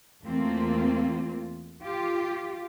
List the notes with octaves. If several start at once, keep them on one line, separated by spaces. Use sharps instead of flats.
E2 A3 A#3 C4 F4
F4 G4